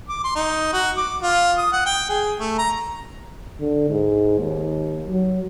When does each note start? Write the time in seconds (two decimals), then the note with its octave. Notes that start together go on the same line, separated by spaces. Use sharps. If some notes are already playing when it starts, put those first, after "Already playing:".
0.08 D6
0.24 C6
0.36 D#4
0.73 F#4
0.97 D6
1.22 F4
1.58 D#6
1.73 F#5
1.86 G5
2.09 G#4
2.39 A3
2.58 A#5
3.60 D3
3.90 G#2
4.39 D#2
5.07 F#3